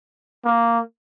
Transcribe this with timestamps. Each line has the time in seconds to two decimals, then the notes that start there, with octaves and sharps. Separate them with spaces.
0.45 A#3